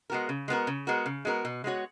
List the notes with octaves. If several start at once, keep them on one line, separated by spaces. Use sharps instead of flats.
G#3 B3 F#4 A#4
C#3
G#3 B3 F#4 A#4
C#3
G#3 B3 F#4 A#4
C#3
G#3 B3 F#4 A#4
B2
G#3 B3 F#4 C#5